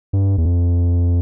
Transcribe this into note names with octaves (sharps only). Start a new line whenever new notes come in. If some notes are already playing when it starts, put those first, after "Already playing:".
G2
E2
F2